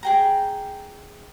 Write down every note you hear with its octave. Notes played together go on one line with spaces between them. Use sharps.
G#4 G5 A#5